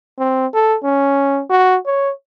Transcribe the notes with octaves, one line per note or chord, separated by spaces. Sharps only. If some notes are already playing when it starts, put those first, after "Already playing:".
C4
A4
C#4
F#4
C#5